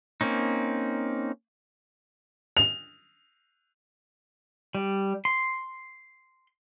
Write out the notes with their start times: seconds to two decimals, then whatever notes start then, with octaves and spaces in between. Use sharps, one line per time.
0.21 A#3 C4 C#4 D#4
2.57 F7
4.75 G3
5.25 C6